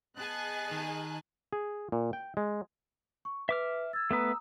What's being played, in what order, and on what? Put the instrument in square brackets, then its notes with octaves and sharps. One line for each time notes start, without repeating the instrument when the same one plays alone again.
[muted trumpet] B3 [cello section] G#4 D#5 [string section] G#5 A5 F#6
[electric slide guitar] D#3
[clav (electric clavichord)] G#4
A#2
G5
G#3
[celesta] C#6
[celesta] B4 [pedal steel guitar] E5 D6 F6
[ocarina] E6 [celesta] G#6 A6
[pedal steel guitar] A3 B3 B4 [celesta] A#5 D#6